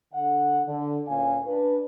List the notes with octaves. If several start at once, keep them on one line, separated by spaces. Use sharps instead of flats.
D3 F#5
D3
D2 A#2 C#4 F5 G#5
D4 B4